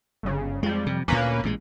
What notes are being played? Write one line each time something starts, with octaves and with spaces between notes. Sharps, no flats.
G1 C#3
F2 G3 G#3
C3
D2 A#2 A#3 C#4 B4
A1 A#2 G#3